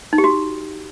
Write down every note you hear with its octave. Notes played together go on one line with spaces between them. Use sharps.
D#4
G4
F#4